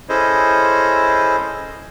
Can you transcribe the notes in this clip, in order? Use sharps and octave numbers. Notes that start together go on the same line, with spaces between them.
C#4 E4 G#4 A4 C5 D#5